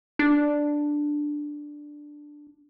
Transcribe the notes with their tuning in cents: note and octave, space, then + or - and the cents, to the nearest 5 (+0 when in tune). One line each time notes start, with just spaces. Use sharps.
D4 +5